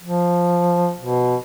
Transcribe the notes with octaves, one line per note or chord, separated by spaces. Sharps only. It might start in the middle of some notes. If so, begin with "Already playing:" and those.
F3
B2